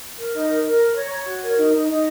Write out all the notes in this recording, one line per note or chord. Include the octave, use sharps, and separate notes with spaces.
A#4
D#4
A#4
A#4
A#5
C#5
C#5
F#4
A#4
D#4
D#4
D#4